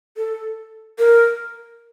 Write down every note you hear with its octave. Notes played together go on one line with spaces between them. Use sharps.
A4
A#4